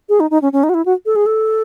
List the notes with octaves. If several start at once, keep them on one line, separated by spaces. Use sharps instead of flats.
G#4
D#4
D#4
C#4
C#4
D#4
F#4
E4
F#4
A4
G#4
A4